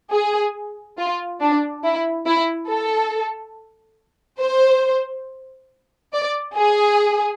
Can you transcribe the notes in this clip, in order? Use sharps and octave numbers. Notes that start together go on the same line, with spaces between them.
G#4
F4
D4
E4
E4
A4
C5
D5
G#4